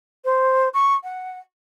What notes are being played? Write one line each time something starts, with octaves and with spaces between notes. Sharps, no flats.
C5
C#6
F#5